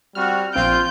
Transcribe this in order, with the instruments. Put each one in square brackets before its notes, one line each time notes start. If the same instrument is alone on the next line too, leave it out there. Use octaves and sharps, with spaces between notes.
[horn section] G3 C4 F#4 [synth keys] F6
[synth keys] A#1 C4 D7 [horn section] F4 [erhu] G6